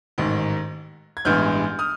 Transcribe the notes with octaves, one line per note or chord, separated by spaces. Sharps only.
A1 G#2 D#3
G#6
A1 G2 E3 G#3 B3 F6 G6
D#6 F6